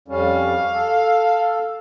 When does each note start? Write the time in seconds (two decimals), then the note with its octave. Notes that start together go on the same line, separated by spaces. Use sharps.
0.08 F2 G3 C#4 F5
0.74 A4